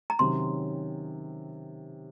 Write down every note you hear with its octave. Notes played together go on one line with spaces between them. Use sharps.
A#5
C3 D#3 F#3 C#4 C6